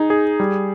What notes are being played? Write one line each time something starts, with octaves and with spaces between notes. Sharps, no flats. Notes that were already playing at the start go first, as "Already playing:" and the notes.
Already playing: D#4 G#4
G#4
G3